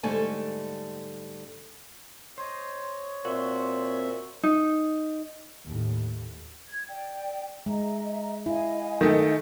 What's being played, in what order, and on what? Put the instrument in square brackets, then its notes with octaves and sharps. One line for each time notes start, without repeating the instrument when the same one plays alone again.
[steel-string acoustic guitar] G#2 D3 G3 A3 A4 G#5
[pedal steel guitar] C5 D#5 [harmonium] C#5
[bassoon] A#2 [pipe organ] C4 E5 [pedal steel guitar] F#4 C6
[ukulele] D#4
[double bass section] D#2 A2
[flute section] G#6
D5 G5
[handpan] G#3 [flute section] D#5 E5 A#5
[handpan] E4 [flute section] D#5 F5 G#5
[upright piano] D#3 A3